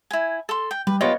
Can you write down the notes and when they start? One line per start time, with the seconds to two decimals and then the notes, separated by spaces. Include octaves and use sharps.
0.11 E4 G#5
0.49 A4 C6
0.71 G5
0.87 G3 B4
1.01 B3 F4 G4 B4 C#5 D#5